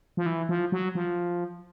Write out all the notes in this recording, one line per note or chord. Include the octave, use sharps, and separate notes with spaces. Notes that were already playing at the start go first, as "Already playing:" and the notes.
F3
E3
F3
F#3
F3